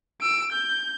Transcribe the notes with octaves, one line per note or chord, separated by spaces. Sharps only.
E6 D7
G6